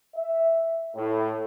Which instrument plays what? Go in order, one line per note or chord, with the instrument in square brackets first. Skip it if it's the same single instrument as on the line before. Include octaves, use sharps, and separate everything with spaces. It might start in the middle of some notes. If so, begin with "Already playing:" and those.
[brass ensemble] E5
A2